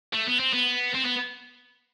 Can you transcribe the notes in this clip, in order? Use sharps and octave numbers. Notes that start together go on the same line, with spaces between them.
A3
B3
C4
B3
C4
B3